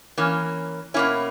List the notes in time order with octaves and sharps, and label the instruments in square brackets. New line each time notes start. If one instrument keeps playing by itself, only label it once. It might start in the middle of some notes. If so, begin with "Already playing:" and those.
[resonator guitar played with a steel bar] E3 A#3 C#4
B2 A#3 C#4 E4